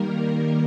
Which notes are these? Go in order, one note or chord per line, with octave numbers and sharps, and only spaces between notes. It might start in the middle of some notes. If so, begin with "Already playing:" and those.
Already playing: D#3 G3 A#3 A#4